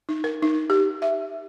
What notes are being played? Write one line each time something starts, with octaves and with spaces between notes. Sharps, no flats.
D#4
A#4
D#4
G4
E5